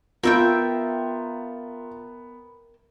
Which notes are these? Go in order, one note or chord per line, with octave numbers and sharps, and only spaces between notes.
B3 F4 A#4 E5 G5